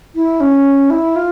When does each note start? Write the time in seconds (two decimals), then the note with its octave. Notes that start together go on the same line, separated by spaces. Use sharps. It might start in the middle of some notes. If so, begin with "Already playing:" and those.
0.15 E4
0.40 C#4
0.90 E4
1.16 F4